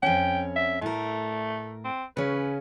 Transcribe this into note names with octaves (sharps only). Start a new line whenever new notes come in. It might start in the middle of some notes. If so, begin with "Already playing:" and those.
F2 C#4 G5
E5
A2 A3 A#4
C4
C#3 C#4 B4